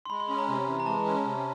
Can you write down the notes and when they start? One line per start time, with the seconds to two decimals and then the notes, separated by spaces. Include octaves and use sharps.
0.06 C6
0.10 G#3 B5
0.20 C6
0.28 C#4 B5
0.38 A#5
0.48 C3
0.67 E3
0.80 A#5
0.86 G#3 A5
1.06 C#4
1.25 C3